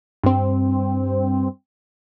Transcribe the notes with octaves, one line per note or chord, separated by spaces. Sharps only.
G2 C4